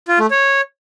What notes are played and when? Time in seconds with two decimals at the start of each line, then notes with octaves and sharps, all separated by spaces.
0.08 F4
0.19 A3
0.31 C#5